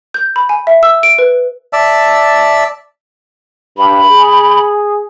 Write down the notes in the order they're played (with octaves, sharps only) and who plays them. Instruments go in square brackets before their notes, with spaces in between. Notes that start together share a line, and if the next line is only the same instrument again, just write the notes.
[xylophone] G6
B5
G#5
E5
E6
D7
B4
[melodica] D5 E5 A5 E6
[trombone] G2 [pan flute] B5
[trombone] G#4